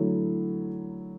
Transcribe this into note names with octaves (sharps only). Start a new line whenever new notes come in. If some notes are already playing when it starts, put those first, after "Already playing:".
Already playing: D3 F#3 A3 E4